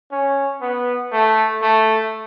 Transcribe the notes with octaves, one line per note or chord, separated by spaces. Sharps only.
C#4
B3
A3
A3